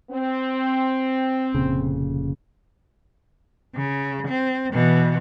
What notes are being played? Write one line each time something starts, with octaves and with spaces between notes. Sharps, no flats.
C4
F1 A#2 C#3
C#3
C4
B2 E3